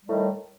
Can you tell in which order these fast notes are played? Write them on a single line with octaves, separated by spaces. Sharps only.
G3 A2 D#3